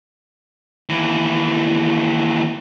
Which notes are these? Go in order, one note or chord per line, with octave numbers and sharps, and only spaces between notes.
D#2 E3